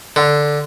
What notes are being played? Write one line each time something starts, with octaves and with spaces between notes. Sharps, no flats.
D3